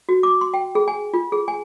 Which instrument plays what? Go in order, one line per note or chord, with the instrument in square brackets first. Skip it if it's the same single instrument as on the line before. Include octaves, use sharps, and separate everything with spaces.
[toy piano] F#4
D6
C6
G5
G#4
G#5
F4
G#4
G#5